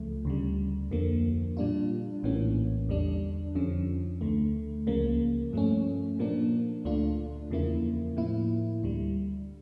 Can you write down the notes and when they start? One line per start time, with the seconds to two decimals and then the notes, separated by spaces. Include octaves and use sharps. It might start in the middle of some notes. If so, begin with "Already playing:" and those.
Already playing: C#2 C#3 F3 A3
0.25 D2 C#3 G3
0.91 F2 D3 F3 A#3
1.57 A#2 G3 D4 F4
2.23 A#1 A2 E3 A#3 C#4
2.89 E2 D3 G3 D4
3.55 F2 D3 F3 C#4
4.21 D2 D3 A3
4.87 C#2 C#3 F3 A#3
5.53 G2 F3 A3 C#4
6.19 A#2 F3 A#3 D4
6.85 D2 D3 A3 D4 F4
7.50 E2 C#3 F3 A#3 E4
8.16 A2 F3 A#3 E4
8.83 D2 D3 G3